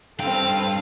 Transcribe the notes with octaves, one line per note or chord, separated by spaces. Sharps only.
G2 C4 A4 F5 G5